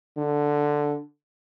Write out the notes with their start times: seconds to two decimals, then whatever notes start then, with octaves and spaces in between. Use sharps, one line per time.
0.17 D3